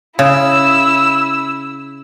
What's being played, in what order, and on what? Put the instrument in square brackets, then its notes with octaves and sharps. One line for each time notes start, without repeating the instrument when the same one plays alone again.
[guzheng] C#3 [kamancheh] E4 E6